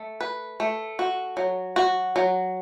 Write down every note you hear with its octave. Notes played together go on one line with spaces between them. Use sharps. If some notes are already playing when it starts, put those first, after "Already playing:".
Already playing: A3
B4
A3
F#4
F#3
F#4
F#3